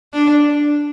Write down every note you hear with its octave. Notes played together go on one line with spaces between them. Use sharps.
D4